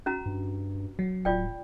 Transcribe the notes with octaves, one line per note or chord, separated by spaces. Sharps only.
C#4 F#4 A#5
G2
F#3
D1 F4 D5 G5